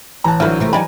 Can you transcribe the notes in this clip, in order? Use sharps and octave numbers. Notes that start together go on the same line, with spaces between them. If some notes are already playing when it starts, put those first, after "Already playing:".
A1 E3 A5 A#5 F#6
D3 E3 F#3 E4 F4 B4 C5 F6
C3 A3 A#4 A#5
F#3 D#4 G4 D5 G#5 B5